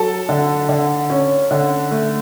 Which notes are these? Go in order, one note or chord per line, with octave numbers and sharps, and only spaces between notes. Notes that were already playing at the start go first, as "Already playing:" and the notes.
Already playing: F#3 A4 A5
D3
D3
C#4
D3
A3